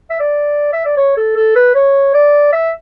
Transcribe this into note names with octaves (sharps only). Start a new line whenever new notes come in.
E5
D5
E5
D5
C#5
A4
A4
B4
C#5
D5
E5